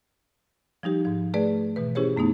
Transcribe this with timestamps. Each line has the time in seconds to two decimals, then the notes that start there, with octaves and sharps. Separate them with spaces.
0.83 F3 G3 D#4 G4
1.05 G#2 F3
1.34 A3 G#4 B4 D5
1.76 B2 E3 B4
1.95 C#4 E4 G4 G#4 C5 C#5
2.17 F#2 A3 B3 D#4